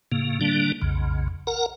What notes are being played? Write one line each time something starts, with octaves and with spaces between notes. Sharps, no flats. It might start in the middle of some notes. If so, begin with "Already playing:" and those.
A2 C#3 A#3
D3 G3 A#3 D4
B1 F2 C#3
A#4 F#5 A#5